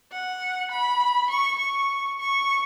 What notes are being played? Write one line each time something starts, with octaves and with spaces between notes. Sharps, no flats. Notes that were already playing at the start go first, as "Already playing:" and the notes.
F#5
B5
C#6
C#6
C#6